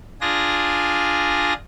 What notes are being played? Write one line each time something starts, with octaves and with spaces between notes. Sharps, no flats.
D4 F4 G#4 A#6